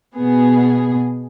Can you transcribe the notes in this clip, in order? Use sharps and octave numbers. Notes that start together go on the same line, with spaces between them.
B2 B3 G#4